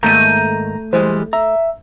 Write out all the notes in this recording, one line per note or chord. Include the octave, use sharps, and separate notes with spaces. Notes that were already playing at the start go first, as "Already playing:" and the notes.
G#2 D#3 A3 A#3 A#5 G6 D#7
E3 G3 G#3 C5
E5 A#5